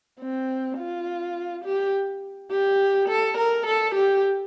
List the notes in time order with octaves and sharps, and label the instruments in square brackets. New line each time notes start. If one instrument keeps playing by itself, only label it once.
[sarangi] C4
F4
G4
G4
A4
A#4
A4
G4